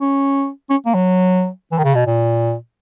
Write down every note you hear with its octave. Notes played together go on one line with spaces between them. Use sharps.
C#4
C#4
A#3
F#3
E3
D#3
C#3
B2
A#2